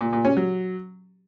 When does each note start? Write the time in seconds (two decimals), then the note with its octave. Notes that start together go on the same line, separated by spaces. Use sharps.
0.01 A#2
0.13 A#2
0.25 C#4
0.37 F#3